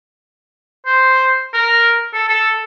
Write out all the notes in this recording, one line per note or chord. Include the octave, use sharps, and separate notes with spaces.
C5
A#4
A4
A4